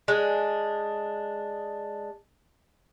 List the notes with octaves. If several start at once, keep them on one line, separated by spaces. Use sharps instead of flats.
G#3 D4